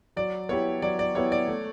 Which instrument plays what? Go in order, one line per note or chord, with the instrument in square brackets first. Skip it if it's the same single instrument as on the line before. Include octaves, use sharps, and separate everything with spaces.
[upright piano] F#3 [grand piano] D5
[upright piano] B3 E4 G4 [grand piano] C#5
[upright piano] F#3 [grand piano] D5
[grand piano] D5
[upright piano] B3 E4 G4 [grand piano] C#5
[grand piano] D5
[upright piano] A3